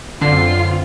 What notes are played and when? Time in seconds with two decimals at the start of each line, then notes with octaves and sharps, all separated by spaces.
0.21 F#2 D3 B3 C4 F4 C7